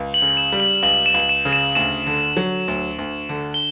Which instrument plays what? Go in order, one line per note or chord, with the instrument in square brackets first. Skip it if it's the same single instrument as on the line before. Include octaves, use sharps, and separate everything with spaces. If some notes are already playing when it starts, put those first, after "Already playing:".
Already playing: [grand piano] C#2
[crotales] F#7
[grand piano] C#3
[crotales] E7
[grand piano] G3
[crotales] F#7
[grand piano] C#2 [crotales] F#7
[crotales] E7
[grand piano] C#2
[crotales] F#7
E7
[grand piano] C#3
[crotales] E7
[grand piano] D2 [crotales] E7
[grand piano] D3
F#3
D2
D2
D3
[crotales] G7